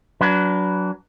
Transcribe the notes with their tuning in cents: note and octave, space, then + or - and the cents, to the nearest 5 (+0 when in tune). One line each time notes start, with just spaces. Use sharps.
F#3 +0 D4 -30 B4 +0